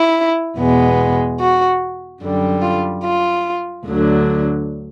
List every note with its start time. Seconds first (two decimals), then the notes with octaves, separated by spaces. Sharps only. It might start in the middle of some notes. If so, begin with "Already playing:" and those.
Already playing: E4
0.58 E2 B2 G#3 B3
1.40 F#4
2.22 F#2 D3 G3
2.62 F4
3.04 F4
3.86 D2 D3 F#3